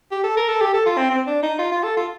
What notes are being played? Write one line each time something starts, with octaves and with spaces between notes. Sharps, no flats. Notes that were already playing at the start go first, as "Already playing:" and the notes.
G4
A4
A#4
A4
G4
A4
F4
C4
C4
D4
D#4
F4
F4
A4
F4